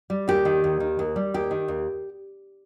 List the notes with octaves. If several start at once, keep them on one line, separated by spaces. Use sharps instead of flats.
G3
D#2 G4
D#3
D#2
D#3
D#2
G3
D#2 G4
D#3
D#2